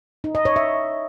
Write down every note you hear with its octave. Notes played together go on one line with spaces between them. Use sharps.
D#4
D#5
C#5
E5